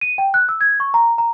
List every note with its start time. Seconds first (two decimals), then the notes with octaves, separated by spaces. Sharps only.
0.01 D#7
0.18 G5
0.34 F#6
0.49 E6
0.61 G#6
0.80 C#6
0.94 A#5
1.18 A#5